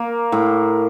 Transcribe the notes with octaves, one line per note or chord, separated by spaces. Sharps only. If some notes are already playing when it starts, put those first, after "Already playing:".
Already playing: A#3
A2